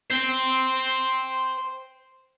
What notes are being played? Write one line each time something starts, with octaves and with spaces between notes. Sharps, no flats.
C5 G5